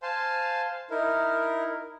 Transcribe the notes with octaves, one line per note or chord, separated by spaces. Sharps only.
C5 F5 G#5 A5 C6
D#4 E4 A#4